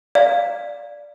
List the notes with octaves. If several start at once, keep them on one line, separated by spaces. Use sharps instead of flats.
D5 F5